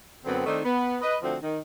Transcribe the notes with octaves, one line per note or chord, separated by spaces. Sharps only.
F#2 D3 B3 C4
D#3 A3 C4 D4 D#4
B3
B4 D#5
D3 F3 A3 C4 D4 F#4
D#3